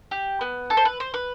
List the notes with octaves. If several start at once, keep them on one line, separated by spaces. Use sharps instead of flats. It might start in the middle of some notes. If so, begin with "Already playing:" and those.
G4
B3
A4
C5
B4
C5
B4